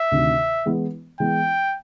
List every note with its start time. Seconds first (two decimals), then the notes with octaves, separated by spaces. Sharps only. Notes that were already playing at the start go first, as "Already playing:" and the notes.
Already playing: E5
0.12 D2 C3 D#3
0.66 E3 G#3 B3
1.20 E3 G#3 B3 G5